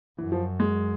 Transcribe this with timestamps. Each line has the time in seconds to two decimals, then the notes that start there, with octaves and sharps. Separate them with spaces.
0.18 F#2 E3
0.32 F3
0.60 G#3